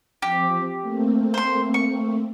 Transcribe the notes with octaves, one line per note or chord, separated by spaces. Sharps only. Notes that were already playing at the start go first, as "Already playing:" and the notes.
F3 C4 G4
A3 A#3 C4
C5 C6
C#6